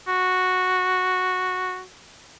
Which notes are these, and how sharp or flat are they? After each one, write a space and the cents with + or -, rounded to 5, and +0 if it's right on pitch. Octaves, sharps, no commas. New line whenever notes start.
F#4 -5